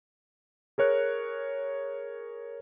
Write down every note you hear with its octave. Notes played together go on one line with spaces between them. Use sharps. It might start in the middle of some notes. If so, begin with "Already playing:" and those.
G#4 A#4 C#5 F#6